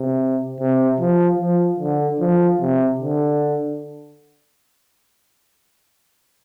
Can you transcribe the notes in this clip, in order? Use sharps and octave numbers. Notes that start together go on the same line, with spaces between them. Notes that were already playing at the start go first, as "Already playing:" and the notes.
Already playing: C3
C3
F3
F3
D3
F3
C3
D3